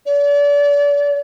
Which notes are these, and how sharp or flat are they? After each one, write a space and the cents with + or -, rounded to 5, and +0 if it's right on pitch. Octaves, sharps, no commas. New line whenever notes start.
D5 -35